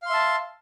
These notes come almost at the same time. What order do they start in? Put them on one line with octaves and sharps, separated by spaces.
F5 C6 E5 A5